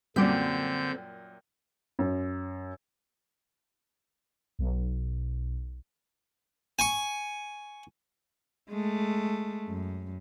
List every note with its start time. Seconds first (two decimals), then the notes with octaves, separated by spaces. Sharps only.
0.16 F#2 A#2 D3 G3 C4 G6 B6
1.99 F#2
4.59 B1
6.79 G#5 C#6
8.70 G#3 A3
9.69 F#2